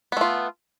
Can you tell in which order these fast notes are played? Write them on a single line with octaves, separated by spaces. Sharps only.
B3 A3 F4